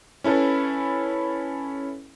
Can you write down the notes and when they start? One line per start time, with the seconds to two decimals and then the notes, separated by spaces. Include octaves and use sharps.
0.24 C#4 E4 A4 B4